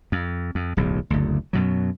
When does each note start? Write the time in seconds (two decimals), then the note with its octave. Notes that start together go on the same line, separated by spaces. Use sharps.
0.12 F2
0.55 F2
0.77 D1 B1 E2
1.10 F#1 D2
1.53 F#2 B2 F#3